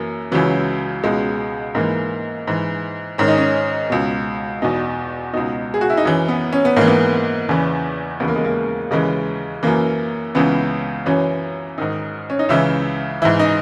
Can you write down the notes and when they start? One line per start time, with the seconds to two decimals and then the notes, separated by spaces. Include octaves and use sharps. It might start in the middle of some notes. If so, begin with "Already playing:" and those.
Already playing: F#2 E3 A#3
0.32 C#2 C#3 E3 F#3
1.04 C#2 B2 G#3
1.75 G#2 E3 A#3
2.47 G#2 E3
3.18 G#2 D#3 C#4
3.28 D#4
3.38 C#4
3.90 C#2 B2
4.62 E2 B2 D#4
5.33 C#2 B2 D#4
5.74 G#4
5.81 F#4
5.90 E4
5.97 D#4
6.05 F#2 E3 C#4
6.28 B3
6.53 C#4
6.65 B3
6.76 G#2 E3 A#3
6.87 B3
7.49 E2 C#3 E3
8.20 D#2 C#3 E3 B3
8.28 A#3
8.36 G#3
8.44 A#3
8.91 D#2 C#3 E3 G#3
9.63 F#2 E3 A#3
10.35 C#2 C#3 E3 B3
11.06 F#2 E3 C#4
11.78 G#2 D#3 D#4
12.30 C#4
12.39 D#4
12.49 C#2 C#3 E3 E4
13.22 G#2 E3 E4
13.39 D#4